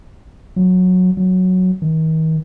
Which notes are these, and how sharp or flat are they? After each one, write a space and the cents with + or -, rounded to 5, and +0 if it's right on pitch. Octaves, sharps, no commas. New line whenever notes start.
F#3 -15
F#3 -5
D#3 +40